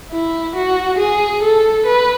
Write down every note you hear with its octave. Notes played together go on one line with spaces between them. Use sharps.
E4
F#4
G#4
A4
B4